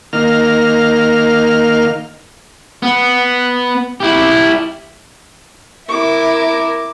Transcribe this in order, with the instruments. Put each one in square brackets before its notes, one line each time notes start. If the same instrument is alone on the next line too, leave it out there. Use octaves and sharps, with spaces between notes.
[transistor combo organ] D#3 A#3 F5 F6
[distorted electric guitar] B3
E4 G4
[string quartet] E4 A#4 [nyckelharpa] D6